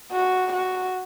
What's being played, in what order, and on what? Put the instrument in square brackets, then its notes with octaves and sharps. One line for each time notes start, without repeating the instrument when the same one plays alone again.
[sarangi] F#4
F#4